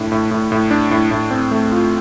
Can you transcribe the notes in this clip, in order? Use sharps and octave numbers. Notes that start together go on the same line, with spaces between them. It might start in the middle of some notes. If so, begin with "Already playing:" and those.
Already playing: A2 D4
A2
A2
A2
D4
A2
A2
C4
A3
F4